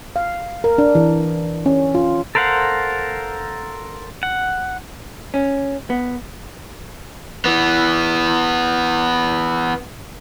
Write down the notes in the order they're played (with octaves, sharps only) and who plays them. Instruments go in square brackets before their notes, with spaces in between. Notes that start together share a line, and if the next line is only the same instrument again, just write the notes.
[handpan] F5
A#4
D4
E3
C#4
F4
[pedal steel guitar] A4 A#4 C5 F5 F#5
F#5
[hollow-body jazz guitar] C#4
B3
[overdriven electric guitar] E3 B3